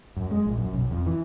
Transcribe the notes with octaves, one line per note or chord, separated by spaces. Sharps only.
F#2
G#3
A#1
F#2
B1
F2
E3